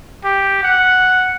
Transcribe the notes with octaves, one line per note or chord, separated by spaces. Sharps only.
G4
F#5